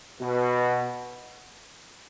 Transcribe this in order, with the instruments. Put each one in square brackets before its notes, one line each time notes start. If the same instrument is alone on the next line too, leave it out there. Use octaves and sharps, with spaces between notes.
[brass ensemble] B2